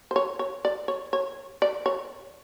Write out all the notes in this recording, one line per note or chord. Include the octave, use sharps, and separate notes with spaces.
C5
C#5
C#5
D5
C#5
C#5
D5
C#5